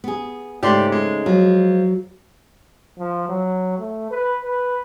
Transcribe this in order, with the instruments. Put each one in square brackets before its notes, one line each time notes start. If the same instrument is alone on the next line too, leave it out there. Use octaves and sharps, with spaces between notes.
[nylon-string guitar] B3 G#4
[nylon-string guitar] G#2 C#3 A3 [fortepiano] G4 D5 C6
[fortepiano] G#3
[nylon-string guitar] F3 [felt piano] F#3
[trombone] F3
F#3
A3
B4
B4